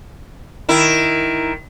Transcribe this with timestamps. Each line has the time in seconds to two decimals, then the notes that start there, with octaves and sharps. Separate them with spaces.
0.69 D#3 E4